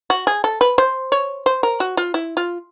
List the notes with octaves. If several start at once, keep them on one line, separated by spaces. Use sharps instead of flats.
F#4
G#4
A4
B4
C5
C#5
C5
A#4
F#4
F4
E4
F4